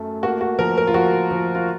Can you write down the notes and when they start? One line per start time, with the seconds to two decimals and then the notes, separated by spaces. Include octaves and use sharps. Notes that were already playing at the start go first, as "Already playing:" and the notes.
Already playing: F#2 A3
0.23 A#3 F#4
0.41 F#4
0.59 F3 A#4
0.78 A#4
0.87 F4
0.94 F3 F#4
1.31 F3
1.55 F4